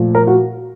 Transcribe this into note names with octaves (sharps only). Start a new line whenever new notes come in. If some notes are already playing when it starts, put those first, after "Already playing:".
Already playing: A#2 F3 A3
A#4
F#4